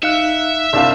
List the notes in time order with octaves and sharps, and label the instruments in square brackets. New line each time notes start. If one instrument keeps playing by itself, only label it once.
[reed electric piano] D#4 F5 F#6 [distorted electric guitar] E5 [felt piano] C#7
[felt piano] C2 D4 F5 [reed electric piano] D5 E6